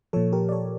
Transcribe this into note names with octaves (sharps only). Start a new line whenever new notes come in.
A#2 F3 A4 C#5
G4 A#4
D5
A4 C#5